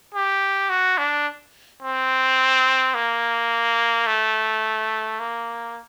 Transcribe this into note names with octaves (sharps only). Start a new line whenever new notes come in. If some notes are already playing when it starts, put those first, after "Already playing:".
G4
F#4
D4
C4
A#3
A3
A#3